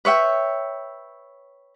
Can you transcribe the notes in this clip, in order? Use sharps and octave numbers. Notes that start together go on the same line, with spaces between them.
B4 C#5 E5 G5